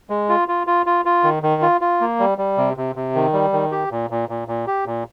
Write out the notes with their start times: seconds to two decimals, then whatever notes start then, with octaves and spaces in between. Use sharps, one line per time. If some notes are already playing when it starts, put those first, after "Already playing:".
0.10 G#3
0.29 F4
0.48 F4
0.67 F4
0.86 F4
1.05 F4
1.24 D#3
1.43 D#3
1.62 F4
1.81 F4
2.01 A#3
2.20 G3
2.38 G3
2.57 C3
2.77 C3
2.95 C3
3.15 D#3
3.33 G3
3.53 D#3
3.72 G4
3.91 A#2
4.10 A#2
4.29 A#2
4.48 A#2
4.67 G4
4.86 A#2